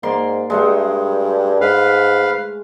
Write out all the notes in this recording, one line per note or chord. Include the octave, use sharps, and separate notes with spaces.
G#2 A#3 D5 C6
G2 G#3 A3 F#5
G#2 B4 F5